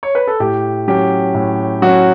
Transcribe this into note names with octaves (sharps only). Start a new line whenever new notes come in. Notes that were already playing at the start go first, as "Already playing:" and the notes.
C#5
B4
A4
A2 G4
F#3 C#4 G4
A2
F#3 C#4 F#4